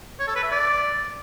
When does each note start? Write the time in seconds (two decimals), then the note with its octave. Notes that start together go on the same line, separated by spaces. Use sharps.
0.20 C#5
0.28 A4
0.35 B4
0.43 E5
0.51 D5